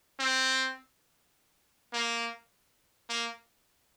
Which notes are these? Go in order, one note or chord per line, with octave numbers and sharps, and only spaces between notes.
C4
A#3
A#3